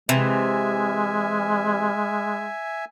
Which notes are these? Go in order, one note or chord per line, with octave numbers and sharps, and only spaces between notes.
C3 E3 G#3 E5 G#5